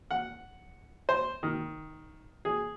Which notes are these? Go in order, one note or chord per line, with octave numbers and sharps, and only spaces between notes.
F#5
C5
D#3
G#4